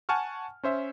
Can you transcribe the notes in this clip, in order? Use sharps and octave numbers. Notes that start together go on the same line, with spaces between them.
F#5 G#5 A5 C#6 F6
C#4 C5 E5